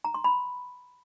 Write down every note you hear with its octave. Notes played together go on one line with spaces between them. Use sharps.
A#5
C6
B5